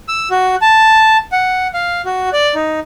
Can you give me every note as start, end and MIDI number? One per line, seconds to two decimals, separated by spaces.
0.08 0.29 88
0.31 0.55 66
0.62 1.17 81
1.32 1.68 78
1.74 2.02 77
2.05 2.29 66
2.33 2.54 74
2.55 2.80 63